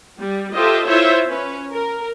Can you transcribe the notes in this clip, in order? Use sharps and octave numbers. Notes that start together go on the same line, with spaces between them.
G3
F4 G4 A4 C5 D#5 E5
E4 F4 C5 C#5 E5
C#4 B4
A#4